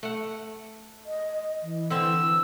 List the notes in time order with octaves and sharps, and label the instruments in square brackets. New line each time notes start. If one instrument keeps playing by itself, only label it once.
[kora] A3 F#5
[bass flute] D#5
E3
[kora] D3 C4 [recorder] E6